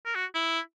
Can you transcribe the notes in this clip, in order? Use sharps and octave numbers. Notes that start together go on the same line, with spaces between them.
A#4
F#4
E4